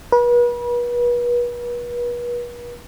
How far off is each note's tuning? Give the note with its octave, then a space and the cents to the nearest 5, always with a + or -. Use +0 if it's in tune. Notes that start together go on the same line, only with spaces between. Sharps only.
B4 -40